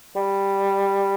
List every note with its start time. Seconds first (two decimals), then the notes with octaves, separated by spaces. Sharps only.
0.16 G3